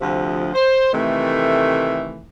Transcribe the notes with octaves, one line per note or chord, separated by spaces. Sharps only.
D2 C3 F3
C5
C3 D#3 E3 A3